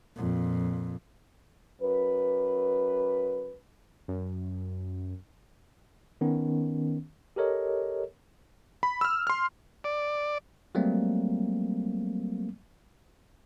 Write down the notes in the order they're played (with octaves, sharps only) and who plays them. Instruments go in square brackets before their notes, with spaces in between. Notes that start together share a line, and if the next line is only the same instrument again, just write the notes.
[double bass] F2 A#2
[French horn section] F#2 B4
[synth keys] F#2
[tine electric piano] D#3 B3 C#4
G4 A4 A#4 C#5 D#5
[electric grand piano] B5
E6 F6
C6 F6
[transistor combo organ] D5
[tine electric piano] F#3 G3 A3 A#3 C4